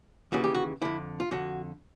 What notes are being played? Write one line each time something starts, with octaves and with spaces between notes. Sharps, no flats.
D#2 C#3 E3 F#4
G4
F#4
F2 D3 E4
F4
F2 D3 F#4